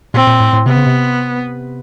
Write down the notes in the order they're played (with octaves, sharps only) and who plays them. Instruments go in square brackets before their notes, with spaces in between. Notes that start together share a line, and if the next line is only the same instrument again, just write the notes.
[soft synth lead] A#2 [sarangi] C4
[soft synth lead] A#2
A2
A2
[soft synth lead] C3 [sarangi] B3
[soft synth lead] C#3
C3